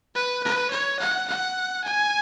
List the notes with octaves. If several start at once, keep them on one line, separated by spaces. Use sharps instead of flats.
B4
B4
C#5
F#5
F#5
G#5